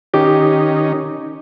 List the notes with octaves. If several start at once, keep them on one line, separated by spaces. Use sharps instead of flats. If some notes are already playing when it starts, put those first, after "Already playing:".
D#3 C#4 D#4 G4